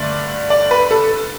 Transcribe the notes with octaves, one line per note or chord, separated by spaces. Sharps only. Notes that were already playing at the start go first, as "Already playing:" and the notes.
Already playing: G2 D3 A3 D5
D5
B4
A4